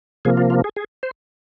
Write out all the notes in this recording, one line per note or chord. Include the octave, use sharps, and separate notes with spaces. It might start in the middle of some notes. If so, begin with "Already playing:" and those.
C3 F3 A#3 G#4
F4
F4
G#4
G#4
C5